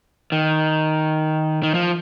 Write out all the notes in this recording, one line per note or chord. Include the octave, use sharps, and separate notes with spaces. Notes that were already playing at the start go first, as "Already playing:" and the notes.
D#3
D#3
F3